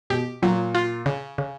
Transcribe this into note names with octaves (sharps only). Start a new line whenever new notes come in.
B2 G4
A#2 F#3
F4
C#3
C#3